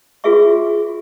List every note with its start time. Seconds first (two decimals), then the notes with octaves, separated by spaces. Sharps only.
0.24 F4 F#4 G#4 B4 E5 C#6